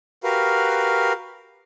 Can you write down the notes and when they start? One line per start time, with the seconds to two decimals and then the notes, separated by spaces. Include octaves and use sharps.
0.24 F#4 G4 A#4 B4 F5